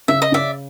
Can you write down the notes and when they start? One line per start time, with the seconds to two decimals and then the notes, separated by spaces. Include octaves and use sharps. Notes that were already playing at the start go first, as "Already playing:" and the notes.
0.08 C#3 E5
0.22 D#5
0.32 C#3 D5 E5